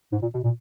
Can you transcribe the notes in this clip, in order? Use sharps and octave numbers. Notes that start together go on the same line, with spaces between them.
G#2
A#2
B2
A#2